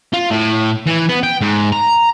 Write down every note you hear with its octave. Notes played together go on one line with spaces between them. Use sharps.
F4
A2
E3
B3
G5
G#2
A#5